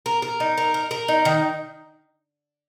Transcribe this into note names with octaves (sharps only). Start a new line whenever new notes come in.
A#4
A#4
D#4
A#4
A#4
A#4
D#4
D#3